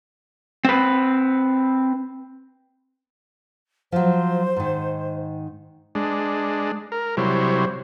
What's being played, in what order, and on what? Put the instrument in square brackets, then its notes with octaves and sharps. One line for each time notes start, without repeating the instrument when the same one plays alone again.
[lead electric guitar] C4 B4
[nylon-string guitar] F3 F#3 [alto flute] C5
[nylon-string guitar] G#2 D#3
[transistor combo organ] G#3 D4
A#4
C3 F#3 G3 E4 C5 C#5